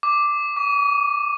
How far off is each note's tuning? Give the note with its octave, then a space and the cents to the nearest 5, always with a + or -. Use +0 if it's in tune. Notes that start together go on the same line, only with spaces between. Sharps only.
D6 +0
D6 -45